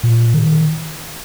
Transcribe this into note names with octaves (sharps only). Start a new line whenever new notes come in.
A#2
D#3